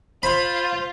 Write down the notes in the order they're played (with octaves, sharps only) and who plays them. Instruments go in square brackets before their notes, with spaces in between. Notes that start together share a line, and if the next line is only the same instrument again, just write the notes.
[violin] F4 [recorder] C5 [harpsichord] B5